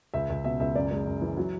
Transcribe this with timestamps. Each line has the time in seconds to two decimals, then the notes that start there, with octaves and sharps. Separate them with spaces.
0.14 C#2 E5
0.30 C#2
0.44 B2 E5
0.60 C#2 E5
0.75 F#2 D5
0.91 G#3
1.06 F#2
1.22 E3
1.37 F#3